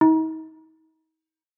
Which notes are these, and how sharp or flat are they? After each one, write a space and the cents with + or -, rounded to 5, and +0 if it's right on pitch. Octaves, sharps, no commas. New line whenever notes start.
D#4 +40